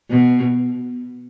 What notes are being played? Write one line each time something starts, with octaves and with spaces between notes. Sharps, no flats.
B2